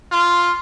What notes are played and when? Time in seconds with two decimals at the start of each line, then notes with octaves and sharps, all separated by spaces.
0.12 F4